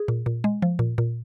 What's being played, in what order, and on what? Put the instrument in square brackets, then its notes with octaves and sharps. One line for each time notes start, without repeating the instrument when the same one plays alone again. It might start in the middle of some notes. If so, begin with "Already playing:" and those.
Already playing: [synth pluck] G#4
A#2
A#2
G#3
F3
A#2
A#2